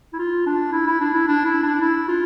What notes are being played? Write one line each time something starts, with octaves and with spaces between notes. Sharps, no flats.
E4
F4
D4
E4
E4
D4
E4
D4
E4
D4
E4
F4